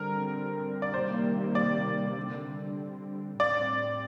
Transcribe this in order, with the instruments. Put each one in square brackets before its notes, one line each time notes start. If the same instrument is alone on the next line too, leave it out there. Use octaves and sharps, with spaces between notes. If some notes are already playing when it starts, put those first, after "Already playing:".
Already playing: [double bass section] D3 G3 C4 [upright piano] A#4
[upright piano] D5
[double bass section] C3 D#3 G3 A#3 [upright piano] C5
[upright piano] D5
[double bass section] D3 G3 C4
[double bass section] A2 G3 C4 [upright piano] D5